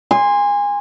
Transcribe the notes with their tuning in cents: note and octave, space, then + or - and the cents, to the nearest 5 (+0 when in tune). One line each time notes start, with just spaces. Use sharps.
G#5 -25 C6 +0